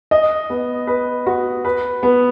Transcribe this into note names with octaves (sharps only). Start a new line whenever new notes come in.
D#5
B3
B4
F#4
B4
B3